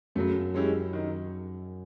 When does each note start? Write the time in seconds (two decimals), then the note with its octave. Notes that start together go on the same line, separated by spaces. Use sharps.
0.15 F#2 C#3 F#3 A3
0.54 G#3 C#4 E4 G4
0.93 D#3